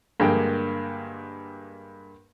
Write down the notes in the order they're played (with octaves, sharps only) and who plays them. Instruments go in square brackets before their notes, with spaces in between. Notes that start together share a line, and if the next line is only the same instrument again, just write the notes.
[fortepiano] G2 D3 G#3 A#3 G5